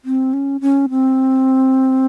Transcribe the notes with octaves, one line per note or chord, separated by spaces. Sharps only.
C4
C#4
C#4
C4